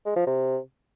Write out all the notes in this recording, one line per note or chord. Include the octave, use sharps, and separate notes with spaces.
G#3
F3
C3